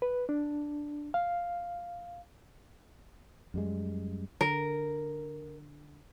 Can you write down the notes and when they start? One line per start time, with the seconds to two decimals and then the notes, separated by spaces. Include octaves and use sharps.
0.02 B4
0.29 D4
1.14 F5
3.54 F#2 G3 G#3
4.41 D3 A#4